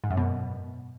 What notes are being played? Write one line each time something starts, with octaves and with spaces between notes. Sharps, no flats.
G#2
F#2
B2